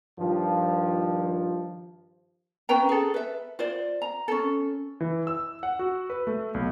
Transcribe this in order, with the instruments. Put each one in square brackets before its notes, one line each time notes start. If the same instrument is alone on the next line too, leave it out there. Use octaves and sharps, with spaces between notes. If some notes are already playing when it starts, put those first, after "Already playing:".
[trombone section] G2 D#3 F3
[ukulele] C#4 B4 G5 A#5
G#4 A4
B4 E5
F4 C5 D5
A#5
C#4 A4
[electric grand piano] E3
E6
F#5
F#4
B4
A3
B1